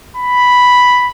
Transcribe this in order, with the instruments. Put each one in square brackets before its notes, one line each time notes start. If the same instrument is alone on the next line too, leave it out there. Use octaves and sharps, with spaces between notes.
[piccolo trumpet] B5